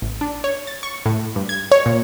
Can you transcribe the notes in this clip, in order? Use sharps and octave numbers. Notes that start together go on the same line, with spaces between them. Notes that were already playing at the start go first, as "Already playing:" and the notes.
A1
D4
C#5
A6
C#6
A2
G2
G#6
C#5
A#2